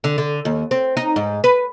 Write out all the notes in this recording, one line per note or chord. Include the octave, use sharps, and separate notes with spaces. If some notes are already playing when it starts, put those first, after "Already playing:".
D3
D3
D#2
C4
D#4
G#2
B4